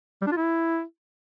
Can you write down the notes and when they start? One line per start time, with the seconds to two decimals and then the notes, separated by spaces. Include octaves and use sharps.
0.22 G3
0.27 D4
0.32 F4
0.37 E4